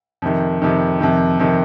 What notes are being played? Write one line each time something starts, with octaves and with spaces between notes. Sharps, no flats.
F2 C3 D#3
F2 C3 D#3
F2 C3 D#3
F2 C3 D#3